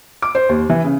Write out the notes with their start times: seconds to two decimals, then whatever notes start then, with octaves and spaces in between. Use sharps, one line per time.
0.22 D6
0.35 C5
0.49 D#2
0.70 E3
0.84 C#3